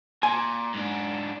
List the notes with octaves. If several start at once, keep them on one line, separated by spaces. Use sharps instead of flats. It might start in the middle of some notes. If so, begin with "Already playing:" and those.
A#2 G#5
G#2 D4